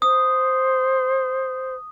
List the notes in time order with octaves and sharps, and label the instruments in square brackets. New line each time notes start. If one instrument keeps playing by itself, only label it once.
[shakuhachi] C5 [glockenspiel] D#6